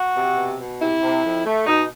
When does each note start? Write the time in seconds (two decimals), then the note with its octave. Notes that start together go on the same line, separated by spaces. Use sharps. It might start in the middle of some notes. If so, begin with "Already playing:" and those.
Already playing: F#4
0.15 C3
0.37 B2
0.59 B2
0.80 C3 E4
1.02 C3
1.24 F2
1.45 A3
1.67 B2 D#4